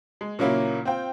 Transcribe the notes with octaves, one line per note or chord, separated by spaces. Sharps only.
G#3
A#2 C#3 F#3 A#3 C#4 E4
C4 F4 G5